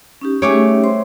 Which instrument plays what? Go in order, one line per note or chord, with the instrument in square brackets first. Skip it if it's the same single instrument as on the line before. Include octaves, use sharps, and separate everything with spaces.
[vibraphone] C#4 D#4 G4
[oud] G3 A3 G#4 [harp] C#5 D6
[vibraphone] C5 C6